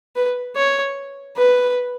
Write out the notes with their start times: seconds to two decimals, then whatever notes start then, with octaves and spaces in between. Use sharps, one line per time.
0.16 B4
0.56 C#5
1.37 B4